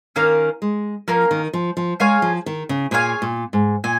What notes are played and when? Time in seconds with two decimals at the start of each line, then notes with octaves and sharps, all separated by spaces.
0.16 D#3 A#3 C#4 A#4 F5
0.62 G#3
1.08 F3 A#3 C#4 A#4 F5
1.31 D#3
1.53 F3
1.77 F3
2.00 G#3 G#4 C#5 F5 G#5
2.22 F3
2.46 D#3
2.69 C#3
2.91 A#2 G#4 C#5 F5 G#5
3.22 A#2
3.53 G#2
3.84 A#2 G#5